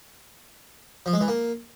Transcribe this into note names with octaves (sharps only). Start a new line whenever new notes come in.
F3
G#3
E3
A#3